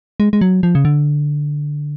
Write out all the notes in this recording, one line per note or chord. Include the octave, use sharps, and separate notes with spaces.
G#3
G#3
F#3
F3
C#3
D3